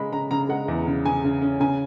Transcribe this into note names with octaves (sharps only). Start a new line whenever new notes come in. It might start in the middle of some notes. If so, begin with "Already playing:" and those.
Already playing: C#3 G#3 B5
C#3 A#5
C#3 A#5
G#3 F#5
E2
C#3
C#3 G#5
C#3
C#4
C#3 G#5